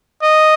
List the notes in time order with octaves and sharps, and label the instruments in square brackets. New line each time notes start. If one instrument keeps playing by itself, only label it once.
[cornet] D#5